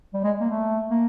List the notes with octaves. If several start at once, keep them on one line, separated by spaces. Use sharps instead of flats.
G3
G#3
A#3
A3
A#3